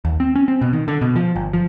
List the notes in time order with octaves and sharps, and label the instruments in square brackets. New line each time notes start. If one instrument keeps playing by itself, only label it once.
[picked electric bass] D#2
C4
C#4
C4
B2
D#3
D3
B2
F3
G1
F3